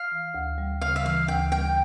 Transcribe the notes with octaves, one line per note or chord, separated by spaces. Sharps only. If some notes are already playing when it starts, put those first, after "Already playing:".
Already playing: F5
E3
D2
G3
C#3 F5
E5
E3 F5
D2 G5
G3 G5